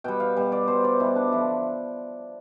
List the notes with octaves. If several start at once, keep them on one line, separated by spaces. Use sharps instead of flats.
B2 G3 G5
F5
B2 G3
D5
B2 G3 C5
D5
B2 G3 E4
D4
D3 F3 E4